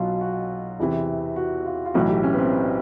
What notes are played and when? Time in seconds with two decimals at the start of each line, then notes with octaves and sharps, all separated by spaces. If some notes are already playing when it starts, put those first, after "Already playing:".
Already playing: B1 B2 F#3 F4
0.21 F#4
0.79 E2 C3 E3
1.36 F#4
1.66 F4
1.86 F4
1.94 B1 A2 E3 F#4
2.09 G4
2.23 C#4
2.34 B3
2.38 C4